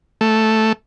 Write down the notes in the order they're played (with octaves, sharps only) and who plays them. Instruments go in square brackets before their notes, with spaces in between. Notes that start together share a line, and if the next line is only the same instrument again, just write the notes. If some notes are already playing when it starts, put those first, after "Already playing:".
[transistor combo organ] A3